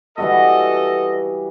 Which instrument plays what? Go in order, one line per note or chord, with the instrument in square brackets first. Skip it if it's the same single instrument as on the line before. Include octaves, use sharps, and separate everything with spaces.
[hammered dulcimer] E3 G3 F#4 [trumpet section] A4 D#5